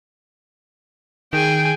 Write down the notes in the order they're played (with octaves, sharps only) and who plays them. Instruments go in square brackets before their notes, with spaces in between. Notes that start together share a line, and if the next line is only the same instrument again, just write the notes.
[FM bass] D#3 [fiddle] G#4 G#5 [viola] G5